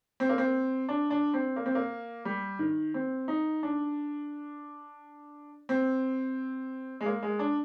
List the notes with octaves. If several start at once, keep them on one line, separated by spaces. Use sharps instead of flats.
C4
A#3
C4
D4
D4
C4
A#3
C4
A#3
G3
D#3
C4
D#4
D4
C4
G#3
A#3
G#3
D4